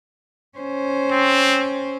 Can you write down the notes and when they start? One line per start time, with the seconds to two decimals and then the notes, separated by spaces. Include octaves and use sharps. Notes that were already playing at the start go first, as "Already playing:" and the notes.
0.58 C#4 C5
1.11 C4